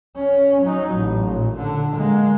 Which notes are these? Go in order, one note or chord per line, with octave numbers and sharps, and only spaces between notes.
C#4
F#3 D#4
A1
A#2
D3
G#3 A#3